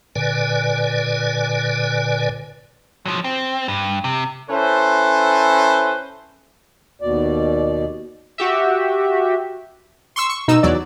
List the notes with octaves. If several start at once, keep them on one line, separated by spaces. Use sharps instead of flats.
A#2 D3 B4 D5 G#5
F3 F#3
C4
G2
C3
C#4 E4 A4 B4 C5
D#2 B2 D5
F#4 G4 E5
C6 C#6 E6
C#6
B2 D#4 E6
E2 F#3 D5